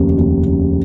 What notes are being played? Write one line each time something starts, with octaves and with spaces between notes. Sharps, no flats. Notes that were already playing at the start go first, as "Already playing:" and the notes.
Already playing: F1 D#2 C#3 A#4
D#2
C#3